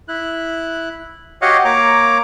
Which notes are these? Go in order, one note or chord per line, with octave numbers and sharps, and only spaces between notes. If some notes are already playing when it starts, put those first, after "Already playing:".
E4 F#6
F#4 G4 C#5 D#5 F5 F#5
A#3 C#5 A#5 D6